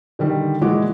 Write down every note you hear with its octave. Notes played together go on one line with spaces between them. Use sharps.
D3 D#3 G3
A#2 E3 G#3 F#4 D6